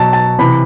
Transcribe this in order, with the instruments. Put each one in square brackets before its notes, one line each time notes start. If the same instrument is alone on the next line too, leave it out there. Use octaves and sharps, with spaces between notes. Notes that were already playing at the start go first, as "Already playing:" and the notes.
Already playing: [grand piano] B2 F#3 A5
A5
C3 E3 B5